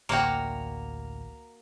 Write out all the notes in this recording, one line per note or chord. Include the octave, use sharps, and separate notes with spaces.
A1 D2 A#3 F#4 C5 D5 G5 A#5